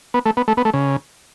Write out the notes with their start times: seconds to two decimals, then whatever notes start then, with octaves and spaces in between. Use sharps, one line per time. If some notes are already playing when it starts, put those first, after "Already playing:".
0.14 B3
0.26 A3
0.37 B3
0.48 A3
0.57 B3
0.65 A3
0.74 C#3